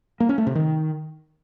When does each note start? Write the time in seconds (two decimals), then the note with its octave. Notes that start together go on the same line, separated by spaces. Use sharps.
0.20 A#3
0.29 C#4
0.38 A3
0.47 C3
0.55 D#3